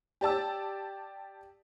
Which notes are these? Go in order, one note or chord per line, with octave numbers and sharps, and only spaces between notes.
G4 D5 A5 E6